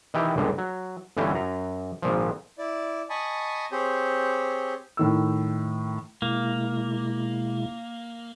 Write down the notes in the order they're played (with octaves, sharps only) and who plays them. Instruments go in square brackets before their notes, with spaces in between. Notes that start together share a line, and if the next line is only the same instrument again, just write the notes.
[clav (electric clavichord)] D#3 E3 G4 G5
G1 C#2 A#2 D3
F#3
G1 D3 E3 C#4 G5
F#2 A#5
G#1 A#2 F3
[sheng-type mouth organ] E4 D5
D#5 G#5 A5 B5 C#6 D#6
C4 G4 G#4 C5 C#5
[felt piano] A2 D#3 E6
[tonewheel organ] B2 G#3 E4 [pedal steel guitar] A#3